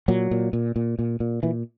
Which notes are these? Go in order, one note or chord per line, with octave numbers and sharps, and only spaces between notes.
A#2 F#3
A#2
A#2
A#2
A#2
A#2
A#2 E3